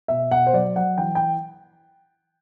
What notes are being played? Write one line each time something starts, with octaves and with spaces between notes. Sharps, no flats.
B2 E5
B2 F#5
C5
F#3 D5
F#3 F#5
E3 G5
G5